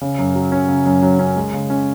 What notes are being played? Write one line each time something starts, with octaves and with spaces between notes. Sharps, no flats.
C#3
F#2
F#3
C#4
C#3
F#2
F#3
C#4
G#3
C#3
C#4